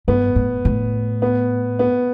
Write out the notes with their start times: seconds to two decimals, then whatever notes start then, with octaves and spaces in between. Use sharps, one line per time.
0.08 G2 B3
0.36 A2
0.65 A2
1.22 B3
1.79 B3